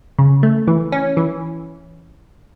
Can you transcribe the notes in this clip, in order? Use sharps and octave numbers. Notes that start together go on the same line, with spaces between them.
C#3
A3
E3
C#4
E3